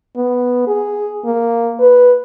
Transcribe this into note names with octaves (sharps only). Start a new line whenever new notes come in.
B3
G#4
A#3
B4